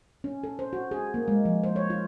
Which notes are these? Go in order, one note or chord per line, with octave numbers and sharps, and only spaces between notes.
C#4
A4
C5
F#4
G#4
A#3
G#3
F3
C5
C#5
F4